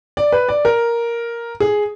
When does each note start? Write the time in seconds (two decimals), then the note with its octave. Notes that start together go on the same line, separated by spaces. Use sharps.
0.17 D5
0.32 B4
0.49 D5
0.65 A#4
1.60 G#4